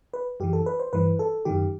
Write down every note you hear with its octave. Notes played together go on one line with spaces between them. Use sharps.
B4
F#2 E3 G4
A4
B4
C5
G2 E3 B4
A4
F#2 D#3 G4